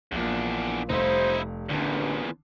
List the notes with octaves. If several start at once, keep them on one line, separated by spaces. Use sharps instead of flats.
A#1 E2 A#2 D4
F1 G3 D#4 E4 C5 F5
A1 E2 A#2 D3 D4